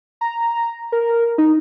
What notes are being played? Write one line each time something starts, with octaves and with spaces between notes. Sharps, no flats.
A#5
A#4
D#4